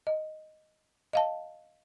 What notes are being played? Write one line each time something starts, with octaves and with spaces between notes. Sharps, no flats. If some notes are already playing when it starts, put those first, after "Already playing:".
D#5
D#5 F5 A5